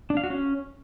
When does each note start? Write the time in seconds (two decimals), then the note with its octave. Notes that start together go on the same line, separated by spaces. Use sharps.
0.10 D4
0.17 F5
0.24 F#4
0.30 C#4